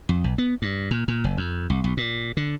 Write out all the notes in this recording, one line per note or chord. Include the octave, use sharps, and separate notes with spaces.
F2
B1
B3
G2
A#2
A#2
F#1
F2
C2
B1
A#2
D3